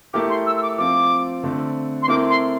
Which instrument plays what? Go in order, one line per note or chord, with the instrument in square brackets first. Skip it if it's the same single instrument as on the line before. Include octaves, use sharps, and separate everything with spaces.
[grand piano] A3 E4 G4 A#4 [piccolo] D6
[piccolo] C6
E6
E6
D6
[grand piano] F3 C4 F4 [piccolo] D6
[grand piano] D3 A3 C4
[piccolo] C6
[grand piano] A3 C4 E4 A#4 [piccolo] D6
[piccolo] C6